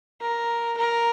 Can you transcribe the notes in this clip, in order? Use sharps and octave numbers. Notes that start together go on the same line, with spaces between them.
A#4
A#4